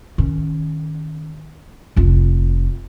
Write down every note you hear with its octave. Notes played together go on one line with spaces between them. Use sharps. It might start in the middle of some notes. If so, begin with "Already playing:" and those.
D#3 C#4
F1 F4